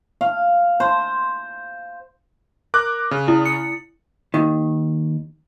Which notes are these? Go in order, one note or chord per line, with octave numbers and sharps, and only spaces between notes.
F5
C5
A#4 D6 F#6
C#3
E4
C#7
D#2 D#3